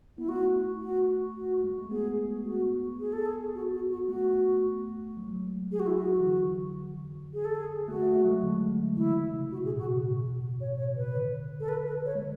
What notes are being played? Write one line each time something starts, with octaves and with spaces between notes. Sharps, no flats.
B3 E4
A3 F#4
F#4
F#4
G#3
A3
B3 G#4
F#4
G#4
A4
G#4
F#4
F#4
F#4
A3 F#4
F#3
G#3
F#3
G#4
F#4
E4
F#4
E3
D3
G#4
A4
G#4
A3 F#4
A3
A3
F#3
G#3
D3
E3 E4
C#3
C#3 F#4
B2 G#4
A2 F#4
B2
A2 C#5
B2 C#5
C#3 B4
D3
A4
B4
B4
C#5
G#3